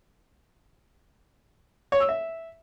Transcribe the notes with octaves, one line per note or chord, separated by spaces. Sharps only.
C#5
E6
E5